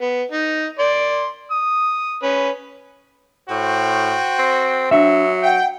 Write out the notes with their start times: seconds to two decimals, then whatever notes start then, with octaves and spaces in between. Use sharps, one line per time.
0.01 B3
0.32 D#4
0.79 D5 C6
1.51 D#6
2.23 C#4 B4
3.50 A2 F#4 C5 G5
4.39 C4
4.91 F#3 D4 E5
5.43 F#5 G5